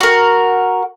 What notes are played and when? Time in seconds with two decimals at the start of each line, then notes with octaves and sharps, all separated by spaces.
0.01 F#4 A#4